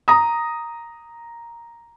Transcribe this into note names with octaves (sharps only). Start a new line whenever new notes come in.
A#5 D#6